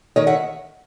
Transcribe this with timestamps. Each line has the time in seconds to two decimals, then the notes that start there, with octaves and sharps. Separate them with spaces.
0.16 D#3 C#5 D#5
0.27 E5 F#5